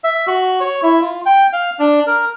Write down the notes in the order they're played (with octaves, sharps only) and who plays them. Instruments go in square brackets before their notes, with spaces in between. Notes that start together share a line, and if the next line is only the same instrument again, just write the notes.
[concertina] E5
F#4
C#5
E4
F4
G5
F5
D4
A#4